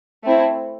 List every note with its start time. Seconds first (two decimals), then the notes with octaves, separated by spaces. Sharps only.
0.24 A3 C4 E4